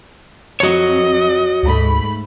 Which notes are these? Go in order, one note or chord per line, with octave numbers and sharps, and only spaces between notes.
F2 F#4 C#5 D#5
D2 G#2 A3 B5